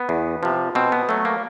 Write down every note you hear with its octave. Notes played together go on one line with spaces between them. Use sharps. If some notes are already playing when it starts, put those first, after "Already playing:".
Already playing: B3
E2
C3 F3
B2 C4
B3
F#3 A3
A#3